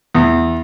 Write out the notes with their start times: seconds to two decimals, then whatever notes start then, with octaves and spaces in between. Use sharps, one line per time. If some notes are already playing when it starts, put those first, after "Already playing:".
0.15 E2